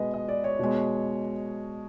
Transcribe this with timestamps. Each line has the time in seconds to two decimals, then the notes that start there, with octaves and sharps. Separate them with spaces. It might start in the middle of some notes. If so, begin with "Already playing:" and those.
Already playing: B2 G#3 B4 D#5
0.14 D#5
0.29 D5
0.44 C#5
0.59 B2 G#3